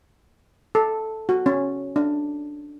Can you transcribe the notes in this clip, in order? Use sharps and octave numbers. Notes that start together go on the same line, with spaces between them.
A4
F#4
C#4
D4